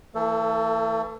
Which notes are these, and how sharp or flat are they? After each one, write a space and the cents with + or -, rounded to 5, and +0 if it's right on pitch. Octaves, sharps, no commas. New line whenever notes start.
E3 +0 A3 +45 A4 +10